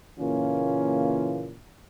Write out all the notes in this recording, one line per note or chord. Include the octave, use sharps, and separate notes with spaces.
A#2 C#3 E3 A#3 C#4 F4